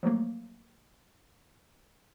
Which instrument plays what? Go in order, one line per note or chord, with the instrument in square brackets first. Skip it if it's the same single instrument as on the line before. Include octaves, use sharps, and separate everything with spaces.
[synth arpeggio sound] F3 F#3 A3 A#3